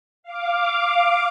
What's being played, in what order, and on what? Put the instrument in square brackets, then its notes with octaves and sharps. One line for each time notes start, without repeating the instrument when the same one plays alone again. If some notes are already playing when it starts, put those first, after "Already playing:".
[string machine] F5 D6